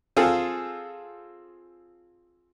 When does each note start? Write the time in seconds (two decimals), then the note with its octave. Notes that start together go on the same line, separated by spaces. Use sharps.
0.17 C4 F4 G#4 A4